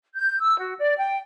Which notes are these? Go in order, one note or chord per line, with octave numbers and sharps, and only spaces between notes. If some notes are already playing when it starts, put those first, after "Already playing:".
G6
E6
F#4
D5
G5